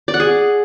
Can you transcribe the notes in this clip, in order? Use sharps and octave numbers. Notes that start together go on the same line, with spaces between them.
D5
F#5
G#4